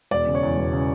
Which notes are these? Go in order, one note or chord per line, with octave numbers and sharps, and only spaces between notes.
E1 D5
C#3
C#5
E2
E1
C#3